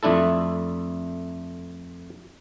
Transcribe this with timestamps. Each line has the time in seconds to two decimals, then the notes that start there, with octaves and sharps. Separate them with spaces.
0.03 F2 A3 D4 E4 A4